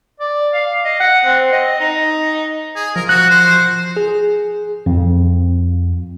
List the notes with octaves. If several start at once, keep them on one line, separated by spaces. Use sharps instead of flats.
D5
F5
D#5
F#5
C4
D#5
D#4
G#4
F3 A#4
F#4 F#6
C5
G#4
F2